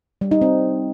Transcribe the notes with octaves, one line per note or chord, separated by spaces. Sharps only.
G3
D#4
C4